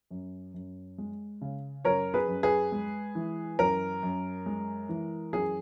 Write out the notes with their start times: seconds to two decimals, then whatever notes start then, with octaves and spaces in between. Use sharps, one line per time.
0.11 F#2
0.54 F#2
0.98 G#3
1.41 C#3
1.85 F#2 A#4 C#5
2.14 G#4 B4
2.28 F#2
2.43 G#4 B4
2.72 G#3
3.15 E3
3.59 F#2 A#4
4.03 F#2
4.46 G#3
4.89 E3
5.33 F#2 G#4